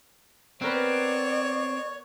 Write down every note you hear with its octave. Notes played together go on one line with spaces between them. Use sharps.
B3 C4 A#4 B4 C#5 D5